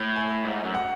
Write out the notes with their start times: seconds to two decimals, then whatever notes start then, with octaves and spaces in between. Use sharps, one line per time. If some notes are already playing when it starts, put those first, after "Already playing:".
Already playing: A2
0.16 G#5
0.45 G#2
0.64 F#2
0.75 F#5